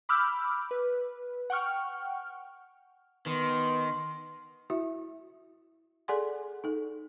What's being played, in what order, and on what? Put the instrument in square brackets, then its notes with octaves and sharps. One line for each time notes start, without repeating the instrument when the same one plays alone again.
[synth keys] B5 D6 E6 F6 G6
B4
F#5 G5 C#6 F6
[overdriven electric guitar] D#3 [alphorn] B3 [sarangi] C6
[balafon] E4 F#4 E5
G#4 A4 D5 F#5 G#5 C6
D#4 A4